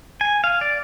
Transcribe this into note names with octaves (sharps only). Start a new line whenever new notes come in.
G#5
F5
D5